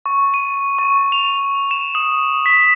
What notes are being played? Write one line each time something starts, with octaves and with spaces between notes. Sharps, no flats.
C#6
D#7
C#6
F7
E7
D#6
B6